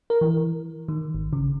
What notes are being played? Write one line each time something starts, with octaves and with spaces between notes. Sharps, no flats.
A#4
E3
D#3
G#1
C#3